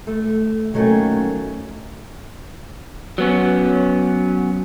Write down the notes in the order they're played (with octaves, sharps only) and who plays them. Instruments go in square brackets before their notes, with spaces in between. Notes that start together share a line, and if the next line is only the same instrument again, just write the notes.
[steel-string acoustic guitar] A3
D#3 F#3 G3 A3 A#3 C#4
[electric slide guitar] F#3 B3 C#4